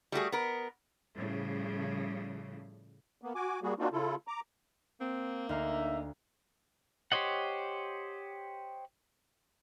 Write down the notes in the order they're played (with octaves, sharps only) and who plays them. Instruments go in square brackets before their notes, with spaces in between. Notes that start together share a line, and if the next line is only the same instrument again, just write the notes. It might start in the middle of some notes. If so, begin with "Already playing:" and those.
[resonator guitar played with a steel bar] G3 A3 F#4 G#4
B3 A#4
[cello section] A2 C#3 F3 G3
[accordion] A#3 B3
F#4 G#5 D6
G3 A#3 F#4 G#4
A#3 C4 D4 D#4 F4 F#4
C#3 E4 F4 A4
A#5 D6
[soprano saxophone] A#3 [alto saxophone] C4
[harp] D2 F5 A#5 [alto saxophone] D#4 [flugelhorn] E5
[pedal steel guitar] G4 C5 C#5 D#5 F#5